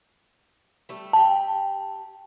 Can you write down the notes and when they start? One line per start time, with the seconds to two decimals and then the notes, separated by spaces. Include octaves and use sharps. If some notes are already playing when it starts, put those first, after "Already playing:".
0.89 G3 A3 A4
1.13 G4 G5 A5